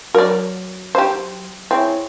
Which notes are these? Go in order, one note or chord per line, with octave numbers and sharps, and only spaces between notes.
F#3 A#4 D5
G4 C5
C4 E4 G#4 C#5